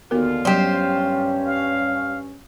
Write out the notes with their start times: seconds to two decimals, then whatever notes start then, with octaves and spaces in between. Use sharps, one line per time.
0.11 D#2 D3 B3 F4 F#4 A#4
0.45 G2 F#3 G3 C#4 G4 C5
1.45 F5